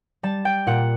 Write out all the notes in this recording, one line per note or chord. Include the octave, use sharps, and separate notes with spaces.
G3 A5
G5
A#2 F#5